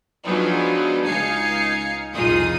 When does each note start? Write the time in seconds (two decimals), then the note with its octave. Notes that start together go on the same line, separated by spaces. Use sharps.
0.24 F3 F#3 G#3 B3 D4 D#4
1.05 C#2 D#4 F5 G#5 C7 C#7
2.14 C2 F2 D#4 F4 G#4 D#6